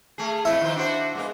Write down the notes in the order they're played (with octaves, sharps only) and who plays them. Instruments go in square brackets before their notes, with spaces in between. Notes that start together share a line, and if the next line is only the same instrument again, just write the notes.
[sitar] A3 G#4
[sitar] F2 F3 A3 [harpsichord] E4
[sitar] D#3 F3 C5
D4 F#4 C5
G#3 A#3 B3